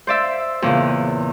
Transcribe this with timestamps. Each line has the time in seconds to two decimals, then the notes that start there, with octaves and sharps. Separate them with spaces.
0.07 C5 D5 E5
0.62 E2 A#2 C#3